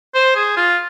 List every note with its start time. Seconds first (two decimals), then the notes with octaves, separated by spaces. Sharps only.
0.14 C5
0.35 G#4
0.56 F4